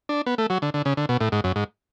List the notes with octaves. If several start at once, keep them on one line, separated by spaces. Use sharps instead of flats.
D4
B3
A3
F#3
D3
D3
C#3
D3
B2
A2
G#2
F#2
G#2